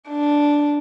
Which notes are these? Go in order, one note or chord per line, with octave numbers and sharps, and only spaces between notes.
D4